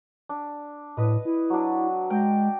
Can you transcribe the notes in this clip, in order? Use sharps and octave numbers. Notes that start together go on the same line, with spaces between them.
D4
A2 B4 D#5
E4
F#3 D4
G#3 G5 A#5